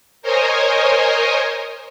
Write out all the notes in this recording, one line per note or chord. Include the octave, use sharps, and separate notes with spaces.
A#4 C5 C#5 D#5 G#5